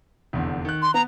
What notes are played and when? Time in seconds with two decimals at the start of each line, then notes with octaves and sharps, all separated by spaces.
0.33 F1 E2 D3
0.65 D#3 F#6
0.82 C6
0.94 B3 A#5